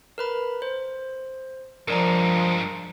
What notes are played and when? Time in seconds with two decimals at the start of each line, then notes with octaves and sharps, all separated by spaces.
0.18 A#4 B4 B5
0.62 C5
1.88 G2 F3 G#3 A#4 D5 A#5